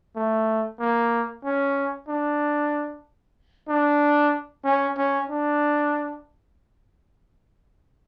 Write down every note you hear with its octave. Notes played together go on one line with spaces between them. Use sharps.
A3
A#3
C#4
D4
D4
C#4
C#4
D4